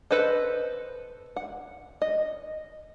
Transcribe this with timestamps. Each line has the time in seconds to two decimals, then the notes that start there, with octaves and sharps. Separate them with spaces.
0.11 A4 B4 C5 D#5
1.36 F#5
2.02 D#5